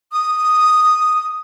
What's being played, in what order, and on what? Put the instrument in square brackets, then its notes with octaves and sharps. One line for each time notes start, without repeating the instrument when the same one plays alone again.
[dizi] D#6